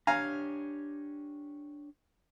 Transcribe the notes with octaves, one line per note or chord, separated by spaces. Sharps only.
D4 G4 C#5 F5 G#5 A#5